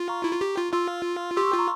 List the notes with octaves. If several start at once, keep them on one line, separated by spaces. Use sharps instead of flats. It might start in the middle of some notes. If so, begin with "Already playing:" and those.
Already playing: F4
A#5 C#6
E4
F4
G4
F4
F4 C6 E6
G4 C6 E6
C#6
C6 E6
F4
A#5 C#6